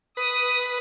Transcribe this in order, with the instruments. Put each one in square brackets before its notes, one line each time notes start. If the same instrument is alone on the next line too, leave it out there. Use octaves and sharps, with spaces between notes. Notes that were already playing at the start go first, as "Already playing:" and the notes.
[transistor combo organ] B4 [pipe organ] D#6